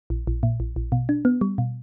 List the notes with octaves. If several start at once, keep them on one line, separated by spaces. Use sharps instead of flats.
A#1
A#1
A#2
A#1
A#1
B2
D4
B3
G3
B2